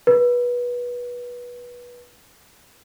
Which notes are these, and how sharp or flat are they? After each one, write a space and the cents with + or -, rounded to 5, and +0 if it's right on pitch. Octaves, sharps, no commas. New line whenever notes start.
B4 -20